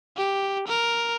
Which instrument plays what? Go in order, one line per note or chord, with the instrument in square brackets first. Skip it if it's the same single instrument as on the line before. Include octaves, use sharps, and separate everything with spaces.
[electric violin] G4
A#4